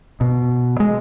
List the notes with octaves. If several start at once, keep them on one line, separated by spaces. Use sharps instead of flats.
B2
G#3